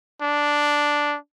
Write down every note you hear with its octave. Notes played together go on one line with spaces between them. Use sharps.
D4